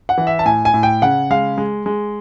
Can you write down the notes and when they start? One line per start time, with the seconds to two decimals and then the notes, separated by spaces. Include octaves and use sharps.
0.09 F#5
0.18 E3
0.27 E5
0.39 A5
0.45 A2 G#5
0.65 G#5
0.74 A2
0.83 G5
1.02 C#3 F#5
1.31 G#3 F5
1.58 G#3
1.86 G#3